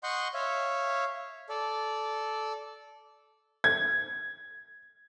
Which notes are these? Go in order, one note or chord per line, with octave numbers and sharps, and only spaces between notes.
D#5 F#5 C6 C#6 G6
C#5 E5 F5
A4 D5
G#6